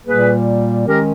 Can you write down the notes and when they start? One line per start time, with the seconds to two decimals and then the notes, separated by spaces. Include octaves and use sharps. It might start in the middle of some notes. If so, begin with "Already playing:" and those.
0.06 A#2 G3 A#3 G#4 B4
0.87 D#3 G#3 C#4 G4 A#4